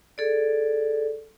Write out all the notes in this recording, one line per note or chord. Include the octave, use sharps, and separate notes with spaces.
G#4 A4 D5